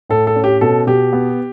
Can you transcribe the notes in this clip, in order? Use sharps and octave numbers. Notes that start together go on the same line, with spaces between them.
A2 A4
A4
C#4
G4
B2 A4
B2 G4
B3